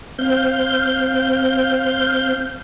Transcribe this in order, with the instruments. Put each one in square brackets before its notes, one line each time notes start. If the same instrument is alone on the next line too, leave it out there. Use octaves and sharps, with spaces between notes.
[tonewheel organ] C4 F5 G6